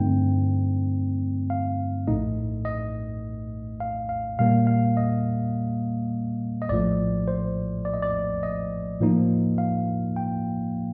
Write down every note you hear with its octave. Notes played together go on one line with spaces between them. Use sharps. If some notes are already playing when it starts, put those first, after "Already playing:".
Already playing: G2 D3 A3 C4 D#4 G5
F5
A#1 A2 A3 D#4 D#5
D#5
F5
F5
A#2 G3 A#3 F5
F5
D#5
D#5
A#1 A2 F3 A3 D5
C5
D5
D#5
D5
D#5
A2 F3 A#3 D#4
F5
G5